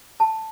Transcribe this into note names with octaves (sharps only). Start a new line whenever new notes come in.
A5